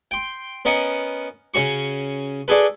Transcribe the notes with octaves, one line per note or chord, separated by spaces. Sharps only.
G5 C6
B3 C#4 A#4 D#5 F#5
C#3 C#4 F#4 C#6
D4 F#4 G#4 A4 B4